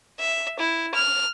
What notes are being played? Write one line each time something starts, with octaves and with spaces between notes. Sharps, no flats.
E5
E4
F6